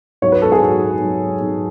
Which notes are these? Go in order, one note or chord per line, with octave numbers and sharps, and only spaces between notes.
G#2 F#3 C#5
B4
A4
G#4
G#2 F#3 F#4
G#2 F#3
G#2 F#3